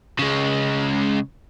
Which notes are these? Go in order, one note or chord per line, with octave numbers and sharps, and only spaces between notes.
C#3 G#3